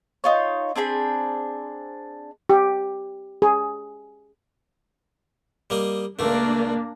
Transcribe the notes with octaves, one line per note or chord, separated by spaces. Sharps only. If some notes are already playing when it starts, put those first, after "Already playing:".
D#4 F4 C#5
C4 D4 G#4 B5
G4
G#4
G3 A#3 D#5
C#2 A#2 A3 A#3 D4